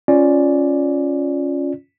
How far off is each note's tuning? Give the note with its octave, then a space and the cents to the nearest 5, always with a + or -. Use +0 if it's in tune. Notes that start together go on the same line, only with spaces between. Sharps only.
C#4 +0 F4 +0 D5 +0